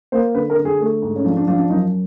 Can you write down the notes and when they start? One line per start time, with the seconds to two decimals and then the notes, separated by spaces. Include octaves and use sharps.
0.12 A#3 C5
0.35 D3 B4
0.50 A#4
0.57 D3
0.65 G#4
0.80 A3
1.02 G#2
1.16 C#4
1.24 F3 D4
1.37 D4
1.47 F3 D4
1.58 D4
1.70 F#2 D#4